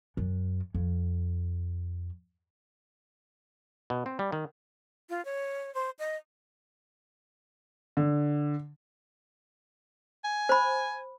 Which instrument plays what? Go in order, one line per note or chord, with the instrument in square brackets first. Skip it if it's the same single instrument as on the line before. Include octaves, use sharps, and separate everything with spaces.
[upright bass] F#2
F2
[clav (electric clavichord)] B2
C4
G3
D#3
[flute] F4
C#5
C5
D#5
[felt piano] D3
[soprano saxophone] G#5
[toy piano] C5 B5